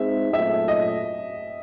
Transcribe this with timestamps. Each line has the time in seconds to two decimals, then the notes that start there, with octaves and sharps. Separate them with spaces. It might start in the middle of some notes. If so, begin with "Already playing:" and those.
Already playing: G#3 C4 D#4 G#4 E5
0.33 A#2 F#3 A3 C#4 F4 E5
0.68 D#5